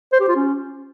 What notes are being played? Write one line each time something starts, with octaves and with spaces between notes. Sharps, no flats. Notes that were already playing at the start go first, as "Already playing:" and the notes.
C5
G4
F4
C#4